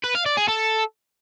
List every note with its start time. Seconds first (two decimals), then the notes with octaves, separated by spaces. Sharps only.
0.04 B4
0.15 F5
0.26 D5
0.37 G#4
0.48 A4